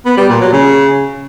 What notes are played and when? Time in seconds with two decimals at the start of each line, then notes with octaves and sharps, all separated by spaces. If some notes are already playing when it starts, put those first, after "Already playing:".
0.05 B3
0.17 G3
0.29 A#2
0.41 F#3
0.53 C#3